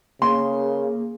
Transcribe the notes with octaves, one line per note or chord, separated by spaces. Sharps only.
C#3 A#3 G#4 C6